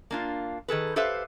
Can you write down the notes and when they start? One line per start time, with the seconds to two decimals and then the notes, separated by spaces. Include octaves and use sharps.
0.11 A#3 D4 F4
0.68 D#3 G#4 A4 B4
0.96 G4 A4 B4 C5 E5 F5